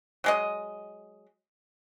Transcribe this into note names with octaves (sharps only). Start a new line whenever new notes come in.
F#3 G#3 D#5